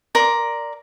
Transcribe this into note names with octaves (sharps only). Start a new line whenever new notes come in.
A#4 D5 C6